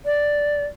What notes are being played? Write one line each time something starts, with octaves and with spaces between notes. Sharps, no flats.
D5